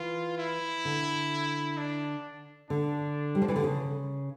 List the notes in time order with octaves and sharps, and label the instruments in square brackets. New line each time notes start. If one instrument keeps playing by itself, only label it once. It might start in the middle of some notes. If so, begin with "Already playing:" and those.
Already playing: [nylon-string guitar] E3 [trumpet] F4
[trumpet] E4
[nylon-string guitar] D3
[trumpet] D4
[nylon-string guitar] D3 [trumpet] D4
[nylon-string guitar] G3
F3
E3
D3
C#3